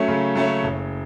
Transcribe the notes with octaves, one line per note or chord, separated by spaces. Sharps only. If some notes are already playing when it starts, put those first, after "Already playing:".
Already playing: F#3 A3 C#4
C#3
F#3 A3 C#4
F#1